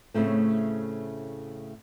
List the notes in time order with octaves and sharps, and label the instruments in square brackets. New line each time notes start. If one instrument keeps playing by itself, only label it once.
[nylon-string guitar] A2 C#3 A3 C4